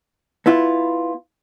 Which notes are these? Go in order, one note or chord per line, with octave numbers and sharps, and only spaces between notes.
B3 E4 F4